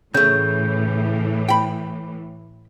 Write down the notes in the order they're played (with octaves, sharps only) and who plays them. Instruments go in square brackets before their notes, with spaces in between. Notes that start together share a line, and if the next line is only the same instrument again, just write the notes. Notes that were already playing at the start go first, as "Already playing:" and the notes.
[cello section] A2 E3 [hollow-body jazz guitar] C#3 A3 [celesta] G6
[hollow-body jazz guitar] G5 B5